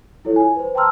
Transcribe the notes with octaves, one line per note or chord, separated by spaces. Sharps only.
E4 F4 A4 C#5
G#5
B4 C5
G5 A5 A#5 C6 E6 F6